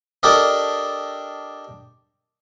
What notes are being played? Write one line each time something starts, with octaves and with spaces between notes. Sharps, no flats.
D4 G4 A4 A#4 D#5